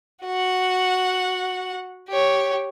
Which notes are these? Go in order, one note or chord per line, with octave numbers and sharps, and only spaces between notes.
F#4 F#5
G4 C#5